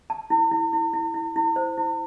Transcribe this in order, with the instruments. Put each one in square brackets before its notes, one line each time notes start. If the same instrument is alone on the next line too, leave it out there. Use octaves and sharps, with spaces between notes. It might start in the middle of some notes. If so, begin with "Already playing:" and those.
[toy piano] A5
E4
E4
E4
E4
E4
E4
C5
E4